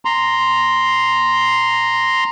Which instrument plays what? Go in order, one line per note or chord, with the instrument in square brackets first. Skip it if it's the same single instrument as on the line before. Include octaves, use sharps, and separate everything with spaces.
[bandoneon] A#5 C6